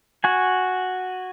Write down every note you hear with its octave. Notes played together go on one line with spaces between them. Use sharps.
F#4 G#5